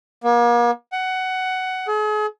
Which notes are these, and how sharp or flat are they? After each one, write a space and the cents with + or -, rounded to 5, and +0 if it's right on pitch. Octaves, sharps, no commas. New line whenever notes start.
A#3 +40
F#5 +15
G#4 +40